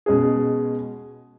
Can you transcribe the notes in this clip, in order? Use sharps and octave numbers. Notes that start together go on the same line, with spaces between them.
B2 G#3 C#4 G#4